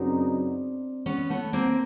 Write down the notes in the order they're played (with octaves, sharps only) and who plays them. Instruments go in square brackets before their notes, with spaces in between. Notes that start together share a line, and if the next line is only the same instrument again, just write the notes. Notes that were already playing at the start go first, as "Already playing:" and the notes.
Already playing: [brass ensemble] F#2 C#3 F#3 B3 D#4 [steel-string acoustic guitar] C4 D4
[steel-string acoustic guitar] B3 C#4
A3 B3
A#3 C4